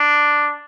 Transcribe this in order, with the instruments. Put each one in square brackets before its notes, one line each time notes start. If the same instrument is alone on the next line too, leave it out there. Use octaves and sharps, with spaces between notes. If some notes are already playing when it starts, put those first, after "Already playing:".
Already playing: [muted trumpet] D4